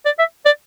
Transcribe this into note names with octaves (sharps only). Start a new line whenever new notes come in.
D5
E5
D5